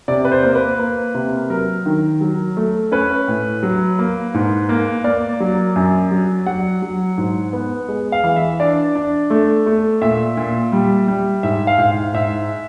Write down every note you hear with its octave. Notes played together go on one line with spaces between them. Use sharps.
C3 D5
B4
C5
A#3
B4
A#3
C3
F#3 A#4
D#3
F#3
A3
C#4 B4
A2
F#3
A#3
G#2
A#3
A#3 D5
F#3
F#2
F#3
F#3 F#5
F#3
G#2
B3
G#3
F5
E3
E5
D4 D5
D4
A3
A3
A#2 E5
A#2
G3
G3
G#2 E5
F5
G#2
F5
G#2 E5